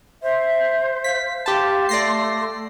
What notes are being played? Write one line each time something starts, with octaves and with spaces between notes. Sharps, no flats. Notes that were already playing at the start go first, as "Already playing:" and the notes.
C5 E5
F5 B6
G4 A5 C6
A3 D5 A#6 C7